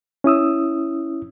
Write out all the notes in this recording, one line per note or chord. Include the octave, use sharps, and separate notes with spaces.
C#4 E4 D#6 E6